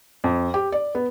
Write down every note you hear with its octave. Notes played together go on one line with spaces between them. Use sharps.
F2
G4
D5
B3